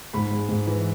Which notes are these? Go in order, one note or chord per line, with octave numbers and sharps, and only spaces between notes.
G#2 B5
G#3
G#2
E3